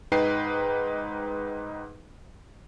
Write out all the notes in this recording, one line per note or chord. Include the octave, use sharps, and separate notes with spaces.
G#2 D#4 B4 G5 C7